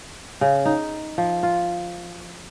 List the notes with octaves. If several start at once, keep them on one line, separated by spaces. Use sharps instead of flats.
C#3
D#4
F3
F4